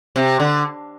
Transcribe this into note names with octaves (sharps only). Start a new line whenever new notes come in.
C3
D3